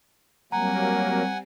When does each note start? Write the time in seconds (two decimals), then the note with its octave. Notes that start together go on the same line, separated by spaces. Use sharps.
0.52 F#3 G3 A#3 C4 F#5 G#5 A#5